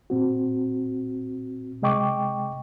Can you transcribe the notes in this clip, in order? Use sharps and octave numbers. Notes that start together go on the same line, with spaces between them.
A#2 C4 F#4
C3 G#3 D#5 G5 C#6 D6